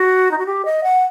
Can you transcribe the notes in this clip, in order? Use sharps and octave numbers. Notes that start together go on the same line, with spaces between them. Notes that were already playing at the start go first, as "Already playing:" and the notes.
Already playing: F#4
D#4
F#4
G4
D#5
F#5